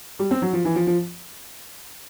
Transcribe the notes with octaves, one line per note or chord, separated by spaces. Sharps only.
G3
C4
F#3
F3
E3
F3
F3